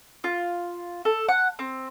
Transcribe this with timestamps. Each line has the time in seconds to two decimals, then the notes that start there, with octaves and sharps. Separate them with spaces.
0.24 F4
1.05 A4
1.28 F#5
1.59 C4